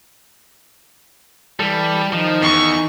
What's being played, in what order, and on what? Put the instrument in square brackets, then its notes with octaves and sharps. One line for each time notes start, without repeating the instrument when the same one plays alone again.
[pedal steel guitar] E3 A4 [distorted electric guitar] G3
[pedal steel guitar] D#3 D#4 [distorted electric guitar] F3
[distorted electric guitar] E2 [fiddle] C#6